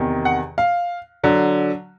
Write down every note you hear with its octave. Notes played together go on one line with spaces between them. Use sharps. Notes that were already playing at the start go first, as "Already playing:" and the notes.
Already playing: E2 C3 D#3
F#5
F5
D3 F#3